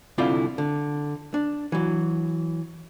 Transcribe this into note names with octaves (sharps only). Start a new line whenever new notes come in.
C2 D3 C4 E4 F4 D5
D3
D4
E3 F#3